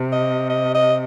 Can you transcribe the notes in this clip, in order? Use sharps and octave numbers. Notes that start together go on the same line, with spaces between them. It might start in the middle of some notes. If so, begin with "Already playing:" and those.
Already playing: C3
D#5
D#5
D#5